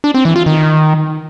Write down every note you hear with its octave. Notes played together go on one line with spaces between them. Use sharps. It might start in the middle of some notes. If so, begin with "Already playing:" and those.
D4
C4
E3
F4
D#3